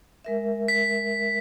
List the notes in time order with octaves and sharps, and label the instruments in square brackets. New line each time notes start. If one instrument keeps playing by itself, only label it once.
[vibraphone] G#3 A#4 E5
[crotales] B6